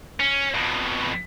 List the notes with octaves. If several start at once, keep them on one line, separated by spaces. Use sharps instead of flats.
C#4
F2 B2